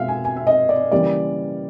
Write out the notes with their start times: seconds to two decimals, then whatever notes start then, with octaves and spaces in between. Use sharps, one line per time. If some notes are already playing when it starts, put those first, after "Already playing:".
Already playing: B2 G#3 E5 F5
0.08 G#5
0.25 G#5
0.37 E5
0.47 D#5
0.69 D5
0.92 C#3 E3 G3 A#3 D5